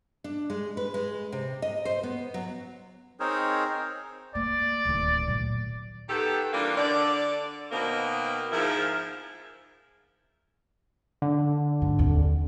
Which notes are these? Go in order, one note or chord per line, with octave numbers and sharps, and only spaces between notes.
D4
G#3
B4
G#3
C3
D#5
C5
B3
F#3
C4 D#4 G#4 A#4 C5 C#5
A#3 D5
D1 D#3
A#2 F#3
D#3 B3 G4 A4
E3 G3 A#3 D4 F4
D3 D5
B2 D#3 A#3 C4
G#2 F3 E4 A#4
D3
G#2
D#2 C4